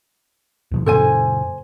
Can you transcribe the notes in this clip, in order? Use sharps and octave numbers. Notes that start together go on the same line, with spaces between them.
D2 B2 F3
F#2 A#2 C#3 A4 C5 G#5